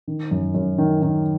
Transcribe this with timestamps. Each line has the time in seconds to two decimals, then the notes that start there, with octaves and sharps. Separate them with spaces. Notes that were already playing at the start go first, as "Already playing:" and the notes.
0.08 D#3
0.31 F#2
0.55 F#2
0.78 D#3
1.02 D#3